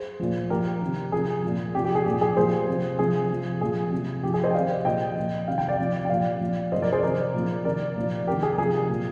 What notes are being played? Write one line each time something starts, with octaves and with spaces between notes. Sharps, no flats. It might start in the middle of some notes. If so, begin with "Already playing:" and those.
Already playing: G#4 C5
A#2 F3
A#2 F3 G4 A#4
C3 D#3
C3 F3 G#4
A#2 F3
C3 F3 G4
G4
G#4
A#2 F3 G4
G#4
A#2 F3 G#4 C5
C3 F3
C3 F3 G#4
C3 F3
A#2 F3 G#4
C3 F3
C3 F3 G4
G#4
C5 D#5
G5
C3 D#3 D5 F5
A#2 F3 D#5 G5
A#2 F3
C3 D#3 F5
G5
D5 F5
C3 F3
G5
A#2 F3 D5 F5
A#2 F3
C3 F3 C5 D#5
A#4 D5
G#4 C5
C3 D#3 A#4 D5
A#2 F3
C3 D#3 A#4 D5
A#2 F3
C3 D#3 G4 A#4
G#4
C3 F3 G#4
A#2 F3